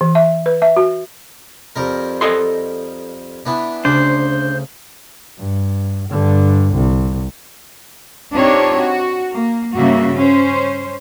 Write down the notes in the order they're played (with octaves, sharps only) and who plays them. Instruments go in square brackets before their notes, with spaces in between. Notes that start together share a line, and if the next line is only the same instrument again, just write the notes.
[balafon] E3
E5
B4
E5
F#4
[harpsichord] F2 G3 A#4
[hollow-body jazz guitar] A4 D#5 C6
[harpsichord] E3 B3 D4
[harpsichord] D2 C#3 [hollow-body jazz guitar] D4 [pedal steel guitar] C5
[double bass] G2
G2 D3
C2
[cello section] C4 D4 D#4 F4 G4 C#5
F#4
A#3
G2 C#3 A#3 F#4 E5
C#4 C5